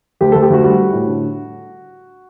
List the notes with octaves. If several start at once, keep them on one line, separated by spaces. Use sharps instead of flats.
D2 G4
D2 A4
G4
D2 F#4
G3 F#4
G3
A2
D3